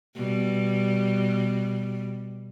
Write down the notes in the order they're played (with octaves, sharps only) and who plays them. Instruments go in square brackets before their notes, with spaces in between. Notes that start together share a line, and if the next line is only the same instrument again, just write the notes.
[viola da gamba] B2 G3